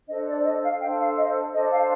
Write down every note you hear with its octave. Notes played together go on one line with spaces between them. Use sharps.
D4 A4 C5 D#5
D5
D#5
F5
D4 A4 C5 G5
F5
D#5
D4 A4 C5 D#5
F5